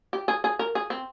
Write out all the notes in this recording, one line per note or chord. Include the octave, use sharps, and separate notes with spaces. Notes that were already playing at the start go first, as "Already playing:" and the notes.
G4
G#4
G#4
A#4
G#4
C4